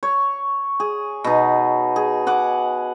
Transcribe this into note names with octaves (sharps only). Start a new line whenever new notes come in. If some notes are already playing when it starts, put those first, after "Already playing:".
C#5
G#4
B2 D#4
G#4
G#4 F#5 D6